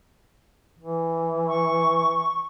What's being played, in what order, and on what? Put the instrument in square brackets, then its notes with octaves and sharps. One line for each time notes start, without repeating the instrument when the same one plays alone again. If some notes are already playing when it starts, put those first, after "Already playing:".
[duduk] E3
[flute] C#6